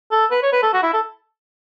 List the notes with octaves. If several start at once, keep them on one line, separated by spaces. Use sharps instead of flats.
A4
B4
C#5
B4
A4
F#4
E4
A4